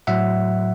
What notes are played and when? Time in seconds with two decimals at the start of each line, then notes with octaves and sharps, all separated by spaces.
0.07 A2 F#3 E5 F#5